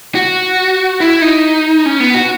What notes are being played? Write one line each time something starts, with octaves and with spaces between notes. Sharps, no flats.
F#4
E4
D#4
C#4
B3
F#4